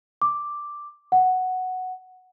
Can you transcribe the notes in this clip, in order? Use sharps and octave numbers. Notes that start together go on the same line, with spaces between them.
D6
F#5